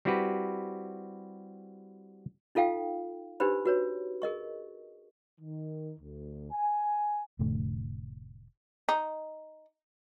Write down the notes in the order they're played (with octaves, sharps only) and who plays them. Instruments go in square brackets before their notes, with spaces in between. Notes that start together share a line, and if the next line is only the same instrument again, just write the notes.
[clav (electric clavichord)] G3 C4 E4 F#4 G4 B4
[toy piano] D#4 F4 A4 F5 G5
D4 D#4 G4 B4 C5 B5
F#4 B4 C#5
G#4 A#4 D#5 C#6
[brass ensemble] D#3
D2
G#5
[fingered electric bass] F1 A2 D3 A3
[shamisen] D#4